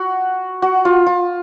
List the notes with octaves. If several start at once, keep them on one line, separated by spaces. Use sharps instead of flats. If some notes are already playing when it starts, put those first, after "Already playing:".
Already playing: F#4
F#4
F4
F4